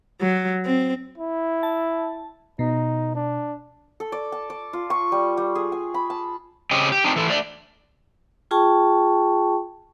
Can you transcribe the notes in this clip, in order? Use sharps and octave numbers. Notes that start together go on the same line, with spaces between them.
F#3
C4
E4
A5
B2 D#4
D4
A4
D5
A5
D5
F4
C#6
G3
G3
G#4
G#5
B5
A5
C#3 C4 G4 D#5
G4
C4 D4 D#4
E3 A4
A3 C#5 D5
F4 G#4 G5 A5 C#6